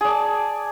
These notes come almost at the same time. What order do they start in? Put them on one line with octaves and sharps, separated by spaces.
G#4 D5 A5